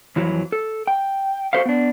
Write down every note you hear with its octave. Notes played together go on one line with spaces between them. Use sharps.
F2 E3 F#3
A4
G5
F#4 G4 A4 C5 E5 F5
B3 D4